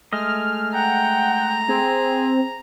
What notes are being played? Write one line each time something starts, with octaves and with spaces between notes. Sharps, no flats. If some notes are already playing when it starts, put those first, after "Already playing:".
G#3 A3 D#5 F6
F#5 G5 A#5
C4 G#4